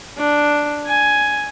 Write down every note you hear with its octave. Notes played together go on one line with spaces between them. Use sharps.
D4
G#5